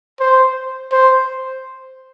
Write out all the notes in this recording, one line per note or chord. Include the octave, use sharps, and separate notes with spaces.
C5
C5